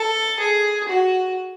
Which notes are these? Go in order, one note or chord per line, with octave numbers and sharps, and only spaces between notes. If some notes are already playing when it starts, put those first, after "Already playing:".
Already playing: A4
G#4
F#4